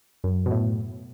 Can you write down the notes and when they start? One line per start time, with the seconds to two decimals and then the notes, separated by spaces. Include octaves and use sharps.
0.24 F#2
0.46 B2
0.51 A2